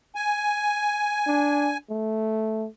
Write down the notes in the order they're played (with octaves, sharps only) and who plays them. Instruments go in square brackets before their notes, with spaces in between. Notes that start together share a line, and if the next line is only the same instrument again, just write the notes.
[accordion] G#5
[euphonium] D4
A3